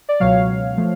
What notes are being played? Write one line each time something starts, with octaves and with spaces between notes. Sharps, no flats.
D5
C#2 B2 F#3 C#5 F5
F3 A3